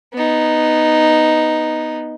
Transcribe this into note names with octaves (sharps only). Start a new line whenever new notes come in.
B3 D#4